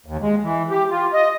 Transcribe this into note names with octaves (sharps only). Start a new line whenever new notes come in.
D#2
G#3
E3
G4
F4
D#5